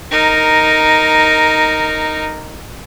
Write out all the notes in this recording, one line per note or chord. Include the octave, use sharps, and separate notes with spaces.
D#4 A#4